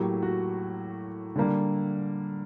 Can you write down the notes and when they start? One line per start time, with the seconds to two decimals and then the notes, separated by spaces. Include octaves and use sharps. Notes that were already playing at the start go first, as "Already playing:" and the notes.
Already playing: A2 F#3 A#3 G4
0.22 F#4
1.36 D3 G3 A#3